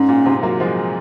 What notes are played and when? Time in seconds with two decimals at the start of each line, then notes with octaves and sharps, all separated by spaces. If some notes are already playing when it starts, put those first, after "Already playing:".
Already playing: G#2 C#4
0.09 A#2
0.25 G#2 C3
0.43 F#3 A#3
0.60 F3 G#3